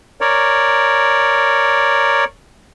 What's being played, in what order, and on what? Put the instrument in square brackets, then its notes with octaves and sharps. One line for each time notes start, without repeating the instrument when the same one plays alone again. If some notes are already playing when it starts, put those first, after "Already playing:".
[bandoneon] A#4 C#5 D5